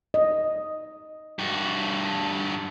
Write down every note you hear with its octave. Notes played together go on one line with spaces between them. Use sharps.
D#5
G2 F#4